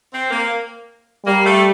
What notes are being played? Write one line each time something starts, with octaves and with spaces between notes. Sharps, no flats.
C4
A#3
G3 A#3
A3